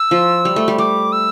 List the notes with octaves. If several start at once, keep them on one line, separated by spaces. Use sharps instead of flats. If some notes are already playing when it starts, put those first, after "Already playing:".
Already playing: E6
F3
G3
A3
G3
G3 D6
E6